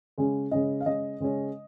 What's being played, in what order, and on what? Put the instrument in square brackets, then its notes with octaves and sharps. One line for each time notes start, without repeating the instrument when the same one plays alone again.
[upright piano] C#3 G#3 C#4
C#3 G#3 C#4 D#5
F5
C#3 G#3 C#4 D#5
C#3 G#3 C#4